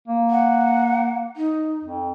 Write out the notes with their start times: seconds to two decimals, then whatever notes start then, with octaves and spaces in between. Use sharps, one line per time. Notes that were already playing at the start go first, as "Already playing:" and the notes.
0.08 A#3
0.30 F#5
1.37 D#4
1.84 F2